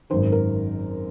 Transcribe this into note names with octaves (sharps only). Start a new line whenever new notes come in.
G#1 F#2 D#3 C5
A#4